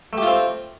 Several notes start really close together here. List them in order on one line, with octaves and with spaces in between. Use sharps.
A3 G4 F4 C4